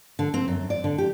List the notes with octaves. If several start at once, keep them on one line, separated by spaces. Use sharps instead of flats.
D3
C4
F#2
D5
D3
G4